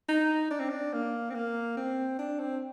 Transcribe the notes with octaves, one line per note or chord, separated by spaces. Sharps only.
D#4
D4
C4
D4
A#3
C4
A#3
C4
D4
C4